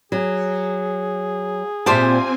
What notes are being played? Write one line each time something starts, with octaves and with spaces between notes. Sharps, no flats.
F#3 G#4
A#2 C4 F4 G4 C5 E5 G#5 A5